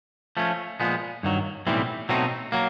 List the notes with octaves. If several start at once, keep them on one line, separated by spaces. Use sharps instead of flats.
F3 A3 C#4
A#2 F3 G#3 B3
G2 D#3 F#3
B1 A2 E3 G3 C4
B2 F#3 A3 C4 D#4
F#3 A#3